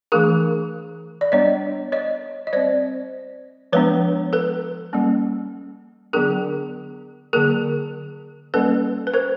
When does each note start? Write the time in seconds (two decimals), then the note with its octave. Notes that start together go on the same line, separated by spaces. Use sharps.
0.12 E3 A3 D4 G#4 A#4
1.21 D5
1.32 G3 B3 D4 C#5 D#5
1.92 C#5 D#5
2.47 D#5
2.53 G3 C4 C5 D5
3.72 F3 G#3 B3 D4 B4 C#5
4.33 A4 B4
4.93 G3 A#3 C#4
6.13 D3 F#3 B3 D4 G#4 A#4
7.33 D3 F#3 A#3 G#4 A#4
8.54 G3 A#3 C#4 A4 B4
9.07 B4
9.14 A#4 C5